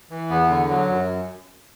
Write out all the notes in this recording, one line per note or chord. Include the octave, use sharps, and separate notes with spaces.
E3
E2 B3
D3
F#3
F#2